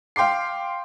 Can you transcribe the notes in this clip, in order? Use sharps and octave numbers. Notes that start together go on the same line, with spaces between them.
F5 G5 C6 D6 C7